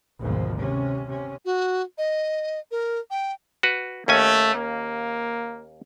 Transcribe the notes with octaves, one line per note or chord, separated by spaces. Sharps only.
G#1 D2 G#2 B2 F3
C3 C#4
C3 C#4
F#4
D#5
A#4
G5
F#4 B4
D#2 A3 C#4 G#5
A#3